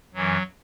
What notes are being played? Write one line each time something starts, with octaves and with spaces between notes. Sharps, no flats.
F#2 E3 F#3